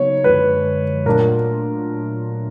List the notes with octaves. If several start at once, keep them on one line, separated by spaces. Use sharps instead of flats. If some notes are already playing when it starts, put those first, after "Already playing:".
Already playing: C#3 F#3 B3 D#4 C#5
F#2 D3 F3 G#3 B4
A#2 F#3 A3 D4 F4 A#4